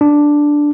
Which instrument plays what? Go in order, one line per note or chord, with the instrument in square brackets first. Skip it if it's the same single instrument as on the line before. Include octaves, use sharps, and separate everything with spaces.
[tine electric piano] D4